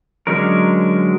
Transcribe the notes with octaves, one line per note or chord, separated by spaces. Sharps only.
D3 F#3 G#3 C#4 A#4